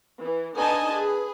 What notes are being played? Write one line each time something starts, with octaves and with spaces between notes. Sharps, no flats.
E3
D3 D#4 B4 D#5 G#5 A5
G#4 B4